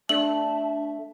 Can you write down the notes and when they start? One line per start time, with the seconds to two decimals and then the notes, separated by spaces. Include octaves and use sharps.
0.09 A3 D4 E5 A5 F#7